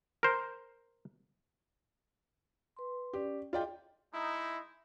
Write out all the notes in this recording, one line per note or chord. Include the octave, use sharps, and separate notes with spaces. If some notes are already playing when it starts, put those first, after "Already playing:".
A#4 C5
B4 C6
C#4 G4 D5
F4 G#4 D5 D#5 G5
G#3 D#4 E4